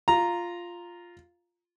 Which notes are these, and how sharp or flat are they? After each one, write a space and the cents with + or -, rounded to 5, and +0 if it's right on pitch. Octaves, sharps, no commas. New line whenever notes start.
F4 +0 A#5 +0